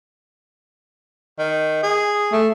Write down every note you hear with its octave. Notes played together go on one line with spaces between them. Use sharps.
D#3
G#4
A3